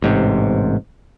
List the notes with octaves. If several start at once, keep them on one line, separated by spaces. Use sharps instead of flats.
A1 G#2 C3